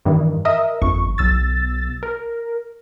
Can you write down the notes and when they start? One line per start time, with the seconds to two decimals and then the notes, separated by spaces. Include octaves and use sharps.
0.05 G2 D#3 E3
0.45 A#4 D#5 E5
0.82 G1 F2 C#6
1.18 B1 E6 A6
2.03 A#4